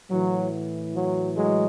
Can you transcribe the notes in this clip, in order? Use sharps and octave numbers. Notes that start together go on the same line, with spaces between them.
A2 E3 F#3
F#3
F#3 G#3